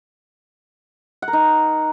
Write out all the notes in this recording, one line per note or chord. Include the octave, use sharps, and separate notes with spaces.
F#5
A#4
D#4